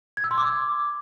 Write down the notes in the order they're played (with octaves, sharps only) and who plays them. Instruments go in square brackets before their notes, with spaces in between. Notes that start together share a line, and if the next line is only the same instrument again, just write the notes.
[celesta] G#6
E6
C6
D6